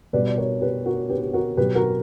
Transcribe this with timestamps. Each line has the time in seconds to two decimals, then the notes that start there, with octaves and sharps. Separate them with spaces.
0.13 B2 G3 B4 D5
0.27 D5
0.38 A#4 C#5
0.61 G4 B4
0.86 F#4 A#4
1.09 G4 B4
1.22 G4
1.33 F#4 A#4
1.57 B2 F#3 G4 B4
1.75 F#4 A#4